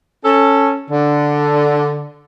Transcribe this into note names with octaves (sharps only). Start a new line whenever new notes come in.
C#4 A4
D3